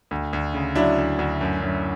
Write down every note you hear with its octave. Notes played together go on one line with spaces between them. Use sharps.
D2
D2
C#3
F#3 D4 E4
D2
D2
F#2
F#2